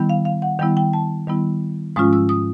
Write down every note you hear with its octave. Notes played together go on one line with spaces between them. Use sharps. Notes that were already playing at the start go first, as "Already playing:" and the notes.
Already playing: D#3 G3 B3 E4
F5
F5
F#5
D#3 G3 B3 E4 G5
G5
A5
D#3 G3 B3 E4
G#2 F3 G#3 C#4 F4 D#6
E6
D#6